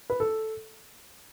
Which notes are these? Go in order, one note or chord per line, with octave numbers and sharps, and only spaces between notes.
B4
A4